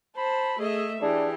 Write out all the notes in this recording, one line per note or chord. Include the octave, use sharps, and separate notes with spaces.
C5 A5 B5
A3 G#4 D#5 E5
E3 D4 G4 G#4